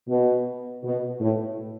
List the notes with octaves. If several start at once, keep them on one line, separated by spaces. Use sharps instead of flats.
B2
B2
A2